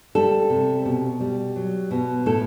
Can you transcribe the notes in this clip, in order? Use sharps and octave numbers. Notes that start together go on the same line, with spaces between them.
G3 A4
C3
B2
G3
F#3
B2
A2 A4